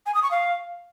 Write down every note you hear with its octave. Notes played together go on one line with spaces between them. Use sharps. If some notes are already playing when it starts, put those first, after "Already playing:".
G#5
D#6
C#6
F5